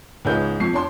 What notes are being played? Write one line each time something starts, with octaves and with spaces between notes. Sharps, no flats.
C#2 G#2 G#4 B4 C#5 G6
F2 C#6 C7
D4 C#5 A5 C6